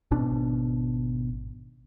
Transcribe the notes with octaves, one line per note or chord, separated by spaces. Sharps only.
G#1 B2 D4